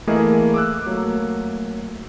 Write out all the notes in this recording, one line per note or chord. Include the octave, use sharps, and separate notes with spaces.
E3 A3 A#3 G#4 A#4 D#5
D6 E6 F#6
F#3 A3 A#3